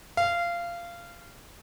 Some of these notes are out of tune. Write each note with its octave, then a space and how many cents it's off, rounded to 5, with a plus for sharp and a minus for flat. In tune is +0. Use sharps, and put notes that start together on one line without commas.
F5 -20